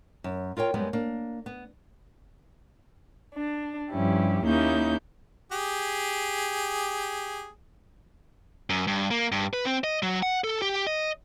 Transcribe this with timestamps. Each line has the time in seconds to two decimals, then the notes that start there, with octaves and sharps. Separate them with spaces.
0.24 F#2
0.57 F4 A#4 C#5 G5
0.74 F#2 G3 G#3 B3
0.93 A#3 D4
1.46 B3
3.36 D4
3.90 G2 F3 C#4 E4 G4
4.45 D#2 A#3 C#4 D#4 E4 G6
5.52 G4 G#4
8.70 F#2
8.87 G2
9.11 A#3
9.32 G2
9.53 B4
9.66 C4
9.84 D#5
10.03 F#3
10.22 F#5
10.44 A4
10.62 G4
10.87 D#5